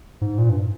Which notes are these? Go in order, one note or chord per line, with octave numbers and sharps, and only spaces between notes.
G#2
A#2
G2